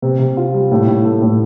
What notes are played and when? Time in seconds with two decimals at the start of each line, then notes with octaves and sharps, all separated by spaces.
0.02 C3
0.19 C3
0.37 F4
0.54 G3
0.71 A2
0.87 A2
1.05 A3
1.22 A2